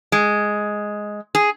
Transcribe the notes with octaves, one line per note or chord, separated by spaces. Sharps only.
G#3
G#4